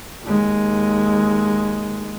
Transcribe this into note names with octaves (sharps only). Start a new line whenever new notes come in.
D#2 G#3